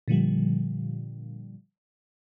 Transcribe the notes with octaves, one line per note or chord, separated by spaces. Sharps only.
A#2 D3 F3 G3